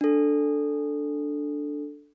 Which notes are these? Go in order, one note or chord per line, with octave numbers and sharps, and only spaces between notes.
D4 A4